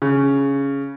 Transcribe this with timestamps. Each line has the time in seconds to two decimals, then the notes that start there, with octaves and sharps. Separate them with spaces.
0.02 C#3